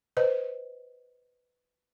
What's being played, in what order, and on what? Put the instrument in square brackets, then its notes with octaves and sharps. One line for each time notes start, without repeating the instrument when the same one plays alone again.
[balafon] B4 C5 D#5